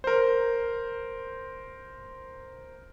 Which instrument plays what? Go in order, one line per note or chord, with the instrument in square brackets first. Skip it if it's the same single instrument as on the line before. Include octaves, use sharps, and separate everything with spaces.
[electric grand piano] A#4 C5